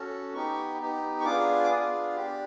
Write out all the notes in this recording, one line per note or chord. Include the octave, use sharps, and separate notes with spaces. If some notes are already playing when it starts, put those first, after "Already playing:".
Already playing: C#4 F#4 A4
B3 D#4 G4 C#6
B3 D#4 G4
C#6
B3 D4 F4 G#4 D6
D6
B3 D4 F4 G#4 D#6
D4 G4